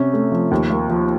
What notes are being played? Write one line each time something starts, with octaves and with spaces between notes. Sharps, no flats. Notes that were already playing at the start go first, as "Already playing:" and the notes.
Already playing: C3 C#4
A3
F3
D#2
A#3
F3